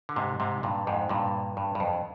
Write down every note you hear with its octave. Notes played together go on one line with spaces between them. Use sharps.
D3
G#2 C3
G#2 C3
G2 A#2
F2 G#2
G2 A#2
G2
G2
F2